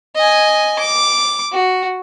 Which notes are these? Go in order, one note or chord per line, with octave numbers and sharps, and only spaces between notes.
D#5 G#5
D6
F#4